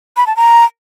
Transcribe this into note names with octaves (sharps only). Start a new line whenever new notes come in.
B5
A5
A#5